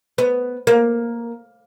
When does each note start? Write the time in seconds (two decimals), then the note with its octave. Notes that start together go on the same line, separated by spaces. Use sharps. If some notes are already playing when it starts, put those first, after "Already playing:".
0.18 B3
0.67 A#3